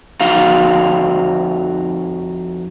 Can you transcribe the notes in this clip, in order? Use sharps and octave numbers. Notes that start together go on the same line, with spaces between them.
F2 D#4 F#4 F5